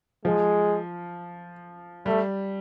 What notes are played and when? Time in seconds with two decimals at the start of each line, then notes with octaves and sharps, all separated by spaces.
0.25 F3 G#3
2.06 G3 A3